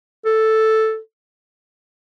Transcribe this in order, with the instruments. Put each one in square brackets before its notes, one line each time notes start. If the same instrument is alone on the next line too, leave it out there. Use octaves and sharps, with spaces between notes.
[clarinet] A4